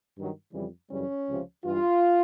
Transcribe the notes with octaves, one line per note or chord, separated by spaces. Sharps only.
G2 D#3 F#3
F2 C#3 E3 G3
F#2 C#3 E3 G3 C#4
C#2 C3 F3
G2 E3 G3 F4